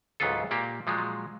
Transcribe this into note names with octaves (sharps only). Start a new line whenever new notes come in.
C#2 G#2 F#3 B3 F4 A4
A#2 A#3 G4
A#2 F3 F#3 G#3